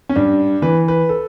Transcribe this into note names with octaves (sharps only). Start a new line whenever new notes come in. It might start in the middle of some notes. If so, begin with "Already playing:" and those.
C#4
G2 D4
E3 B4
B4
A4